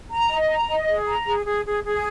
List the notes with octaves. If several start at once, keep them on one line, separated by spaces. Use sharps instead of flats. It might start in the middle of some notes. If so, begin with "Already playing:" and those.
A#5
D#5
A#5
D#5
G#4
A#5
G#4
G#4
G#4
G#4